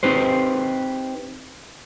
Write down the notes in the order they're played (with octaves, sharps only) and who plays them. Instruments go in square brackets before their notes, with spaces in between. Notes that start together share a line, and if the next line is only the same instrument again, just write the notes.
[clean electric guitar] C4 D#4 G4 B4 C5